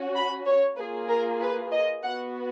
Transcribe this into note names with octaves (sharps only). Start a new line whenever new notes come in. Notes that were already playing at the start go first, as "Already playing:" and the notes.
Already playing: C#4 F#4
B5
C#5
A#3 F4 G#4 B4
A#4
B4
D#5
B3 F#4 F#5